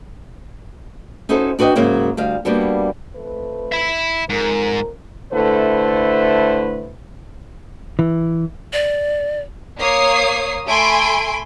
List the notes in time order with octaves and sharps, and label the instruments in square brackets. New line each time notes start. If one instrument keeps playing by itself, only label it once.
[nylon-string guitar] C#4 D#4 E4 F#4 A4 C5
D4 F#4 B4 D#5 G5
G#2 C#3 F#3 A#3 E4
D2 G3 F5
G3 A#3 B3 D4 F#4
[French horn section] F2 A3 B4
[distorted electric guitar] E5 B5
[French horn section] F2 A#4 [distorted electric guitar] G#2
[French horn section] D3 A3 E4 A4 B4 C5
[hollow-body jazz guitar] E3
[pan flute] D5
[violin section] A#3 C#5 D#6 C7
A3 G#5 B5 C6 D7